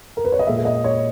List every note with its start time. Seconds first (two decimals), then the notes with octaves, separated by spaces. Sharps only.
0.17 A#4
0.25 B4
0.32 C#5
0.39 D#5
0.47 A#2 G#3 E5
0.65 D#5
0.84 C#5